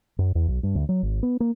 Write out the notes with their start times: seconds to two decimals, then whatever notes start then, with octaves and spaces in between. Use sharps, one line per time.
0.19 F#2
0.35 E2
0.48 B1
0.63 G2
0.75 D2
0.89 F#3
1.03 G#1
1.23 B3
1.40 A#3